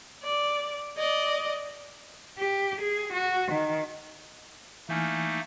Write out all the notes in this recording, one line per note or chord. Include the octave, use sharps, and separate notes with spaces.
D5
D5 D#5
G4
G#4
F#4
D#3
E3 A3 A#3 D#4 G#5 F6